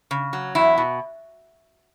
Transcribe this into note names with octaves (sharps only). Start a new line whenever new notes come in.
C#3
F#3
E2 E4
B2